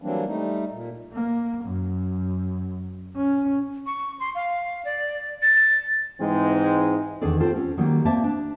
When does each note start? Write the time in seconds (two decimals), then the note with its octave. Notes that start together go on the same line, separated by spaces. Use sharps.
0.02 E3 F#3 G3 A#3 C4 D4
0.27 G3 A3 D#4
0.71 A#2
1.13 A#3
1.65 F#2
3.17 C#4
3.86 C#6
4.20 C6
4.35 F5
4.85 D5
5.42 A6
6.21 G#2 E3 G#3 C4 D#4
7.22 E2 D#3 D4 G#4 A4 D5
7.40 C4 F4 G4 A4 C5
7.56 C#4
7.77 D#3 F#3 G3 A#3
8.05 A#3 C4 D5 E5 A5
8.24 D4